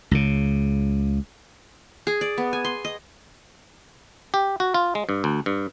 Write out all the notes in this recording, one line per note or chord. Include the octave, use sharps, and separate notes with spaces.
C#2 C#3
G#4
D5
B3
G#5
C6
D#5
G4
F#4
F4
G#3
G2
D2
G2